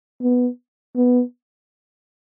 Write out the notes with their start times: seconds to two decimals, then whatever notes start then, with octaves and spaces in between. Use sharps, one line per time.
0.22 B3
0.96 B3